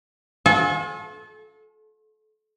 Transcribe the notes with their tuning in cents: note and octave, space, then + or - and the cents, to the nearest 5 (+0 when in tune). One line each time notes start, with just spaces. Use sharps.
F4 +45 A4 -30 G#5 +0